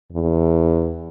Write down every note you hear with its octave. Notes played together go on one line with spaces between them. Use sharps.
E2